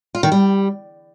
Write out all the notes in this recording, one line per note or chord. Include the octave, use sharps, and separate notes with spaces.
F4
D#3
G3